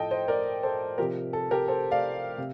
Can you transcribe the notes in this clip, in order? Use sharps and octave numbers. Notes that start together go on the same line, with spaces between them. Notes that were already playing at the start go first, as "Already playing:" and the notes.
Already playing: A2 F3 A4 D#5 G5
C5 D#5
A#4 D5
A4 C5
C3 F3 G4 A#4
A4
G4 A#4
A4 C5
D5 F5
C3